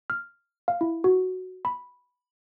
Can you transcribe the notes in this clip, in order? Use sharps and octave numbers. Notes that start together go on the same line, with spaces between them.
F6
F5
E4
F#4
B5